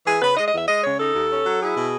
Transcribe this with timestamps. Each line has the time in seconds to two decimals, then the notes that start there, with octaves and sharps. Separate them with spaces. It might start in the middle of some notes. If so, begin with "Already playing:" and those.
0.05 E3 G#4
0.21 C#3 B4
0.36 G#3 D#5
0.47 D#5
0.53 E2
0.58 E5
0.68 G#3 D#5
0.84 C#3 C#5
0.98 D#4 A4
1.14 D#2
1.30 C#4
1.45 F#3
1.61 E4 G#4
1.76 B2